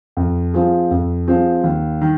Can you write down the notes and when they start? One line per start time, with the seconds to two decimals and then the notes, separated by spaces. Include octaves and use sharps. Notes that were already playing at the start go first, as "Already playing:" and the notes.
0.17 F2
0.54 F3 C4 F4 G#4
0.91 F2
1.28 F3 C4 F4 G#4
1.64 D#2
2.01 D#3